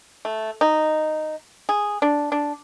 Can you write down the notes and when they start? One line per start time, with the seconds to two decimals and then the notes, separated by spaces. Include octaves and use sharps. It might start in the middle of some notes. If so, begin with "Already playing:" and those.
0.25 A3
0.61 D#4
1.69 G#4
2.02 D4
2.32 D4